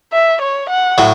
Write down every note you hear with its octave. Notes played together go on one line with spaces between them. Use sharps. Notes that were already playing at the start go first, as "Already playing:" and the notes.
E5
C#5
F#5
A2 F#3